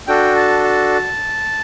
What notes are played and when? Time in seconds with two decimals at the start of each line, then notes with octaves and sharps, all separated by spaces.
0.07 D4 F#4 A4 G5
0.36 A5
0.64 A5